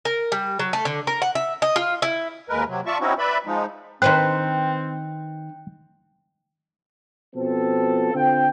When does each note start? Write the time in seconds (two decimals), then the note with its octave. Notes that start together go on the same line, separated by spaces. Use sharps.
0.05 A#4
0.32 G3
0.59 F#3
0.73 A3
0.85 D3
1.07 A#4
1.22 F#5
1.35 E5
1.62 D#5
1.76 F4
2.02 E4
2.49 D#2 G#3 A#4 B4
2.68 C3 F#3
2.86 F4 D5 E5 A5 C#6
3.01 C4 C#4 D#4 E4 F#4
3.19 B4 D5 E5 B5
3.46 F3 G#3 D#4
4.02 D#3 C4 B4 C5 G5 F#6
7.35 B2 F3 C4 A4
8.13 D3 C4 F4 G5